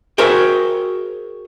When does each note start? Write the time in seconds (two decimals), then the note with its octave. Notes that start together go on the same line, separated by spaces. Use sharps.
0.18 F#4 G#4 A#4 C5 E5 G5